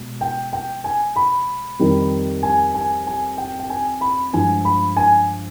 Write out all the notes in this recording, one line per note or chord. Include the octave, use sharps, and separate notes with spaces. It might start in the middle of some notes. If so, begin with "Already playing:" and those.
Already playing: B2 G#3
G5
G5
G#5
B5
F2 D#3 G3
G#5
G#5
G#5
G5
G5
G#5
B5
G2 F3 G#3 G#5
B5
G#5